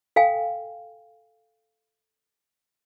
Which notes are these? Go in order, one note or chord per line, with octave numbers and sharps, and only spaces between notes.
A4 F5 G5 G#5